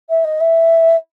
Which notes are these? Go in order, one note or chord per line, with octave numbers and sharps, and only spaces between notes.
E5
D#5
E5